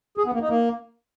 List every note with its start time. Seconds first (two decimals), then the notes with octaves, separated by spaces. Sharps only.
0.18 G#4
0.25 B3
0.33 A#3
0.41 D#4
0.49 A#3